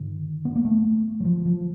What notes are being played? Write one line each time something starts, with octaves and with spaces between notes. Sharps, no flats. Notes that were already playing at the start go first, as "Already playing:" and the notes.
Already playing: G2 D3 D#3
B3
A#3
A3
F#3
F3
F3